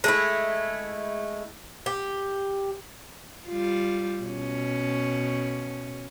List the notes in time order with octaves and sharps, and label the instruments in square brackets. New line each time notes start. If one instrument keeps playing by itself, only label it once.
[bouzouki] G#3 A3 E4
G4
[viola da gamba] G3 F4
B2 C#4